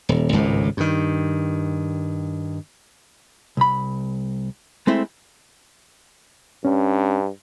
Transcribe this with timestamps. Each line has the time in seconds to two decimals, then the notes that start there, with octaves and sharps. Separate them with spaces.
0.09 D#1
0.32 G#1 C#2 A2
0.77 G2 D#3
3.57 C2 B5
4.87 G#3 A3 C4 E4
6.65 G2 C#4